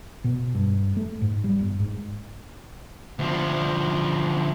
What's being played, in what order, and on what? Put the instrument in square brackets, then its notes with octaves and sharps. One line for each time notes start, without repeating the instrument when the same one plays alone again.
[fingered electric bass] B2
G2
A3
G#2
G3
G1
G#2
[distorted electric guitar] D2 F3